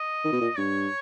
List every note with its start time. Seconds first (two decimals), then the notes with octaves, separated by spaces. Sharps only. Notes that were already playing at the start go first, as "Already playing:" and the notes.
Already playing: D#5
0.24 D#3
0.32 B2
0.41 A#2
0.57 G2 C#5